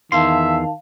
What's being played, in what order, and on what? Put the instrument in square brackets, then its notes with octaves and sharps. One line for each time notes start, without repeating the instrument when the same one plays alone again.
[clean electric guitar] E2 C6 [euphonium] D#3 [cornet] E5 [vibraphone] F5 A5